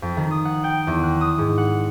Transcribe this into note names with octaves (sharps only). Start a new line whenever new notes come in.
F2
D#3
D#6
F#5
G5
E2
F#6
D#6
G#2
F#5